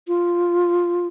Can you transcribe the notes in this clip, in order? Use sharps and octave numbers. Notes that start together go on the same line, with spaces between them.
F4